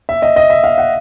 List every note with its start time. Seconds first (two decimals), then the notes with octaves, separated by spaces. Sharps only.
0.09 E5
0.22 D#5
0.36 D#5
0.50 E5
0.64 F5
0.78 F#5